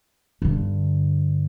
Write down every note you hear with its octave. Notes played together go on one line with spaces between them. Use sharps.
G2 D3